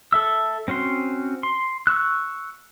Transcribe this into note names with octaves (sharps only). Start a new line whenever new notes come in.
A4 E5 E6
C4 C#4 F#4 C6
C6
C#6 E6 F#6